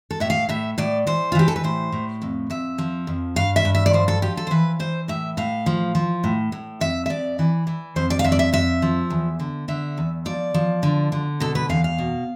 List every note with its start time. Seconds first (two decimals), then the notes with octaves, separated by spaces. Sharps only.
0.11 A4
0.20 A2 E5
0.30 F5
0.49 A2 E5
0.78 A2 D5
1.07 E3 C5
1.32 F4
1.35 E3 G4
1.48 A4
1.56 B4
1.64 A2 C5
1.92 A2
2.22 F2
2.50 F2 E5
2.78 F3
3.07 F2
3.36 G2 F5
3.56 E5
3.65 G2
3.75 E5
3.86 D5
3.93 F3 C5
4.08 A4
4.22 F3 G4
4.37 A4
4.47 C5
4.51 E3 B4
4.79 E3 C5
5.08 A2 E5
5.37 A2 F5
5.66 F3
5.95 F3
6.24 A2
6.52 A2
6.81 F2 E5
7.06 E5
7.10 F2 D5
7.39 E3
7.67 E3
7.96 F2 C5
8.10 D5
8.19 F5
8.24 F2 E5
8.32 D5
8.39 E5
8.53 F2 E5
8.82 F3
9.10 E2
9.40 D3
9.68 D3 E5
9.98 E2
10.25 F3 D5
10.54 F3
10.83 D3
11.12 D3
11.40 B2 A4
11.55 B4
11.69 E2 F5
11.84 F5
11.98 B2